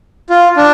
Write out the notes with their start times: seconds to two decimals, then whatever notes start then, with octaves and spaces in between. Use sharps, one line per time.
0.30 F4
0.57 D4